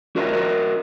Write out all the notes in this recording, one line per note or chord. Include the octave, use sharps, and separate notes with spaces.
F#4 A#4 C5 D#5 E5
F#4 A#4 D#5 E5